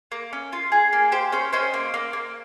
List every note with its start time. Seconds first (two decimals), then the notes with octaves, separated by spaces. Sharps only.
0.12 A#3
0.33 C#4
0.53 F4
0.72 G#4
0.93 A#3
1.12 G4 C5
1.32 C#4 C5
1.53 C#4 C5 D#5
1.74 A#3
1.94 A#3
2.13 A#3